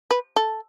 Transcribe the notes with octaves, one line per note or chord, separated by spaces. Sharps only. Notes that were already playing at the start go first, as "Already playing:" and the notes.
B4
A4